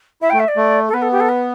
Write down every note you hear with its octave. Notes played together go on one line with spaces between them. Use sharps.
E4 E5
G5
A3
E5
D5
A3
A4
B3 B4
A4
G4
A4
B4